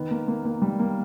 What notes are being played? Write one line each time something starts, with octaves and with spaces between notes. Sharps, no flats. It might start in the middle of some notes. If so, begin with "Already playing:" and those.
Already playing: D#3 B3
A#3
A#3
A#3
G3
A#3